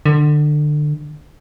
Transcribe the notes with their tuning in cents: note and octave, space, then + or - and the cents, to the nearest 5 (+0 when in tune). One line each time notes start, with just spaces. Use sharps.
D3 +25